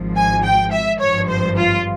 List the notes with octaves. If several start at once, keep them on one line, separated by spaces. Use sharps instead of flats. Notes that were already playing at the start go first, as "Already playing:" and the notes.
Already playing: G#1 G#2 F3
G#5
G5
E5
G#1 G2 F3 C#5
C5
F4